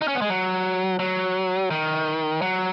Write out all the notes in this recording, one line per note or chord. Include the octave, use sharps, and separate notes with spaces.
D#4
C#4
B3
G#3
F#3
F#3
D#3
F#3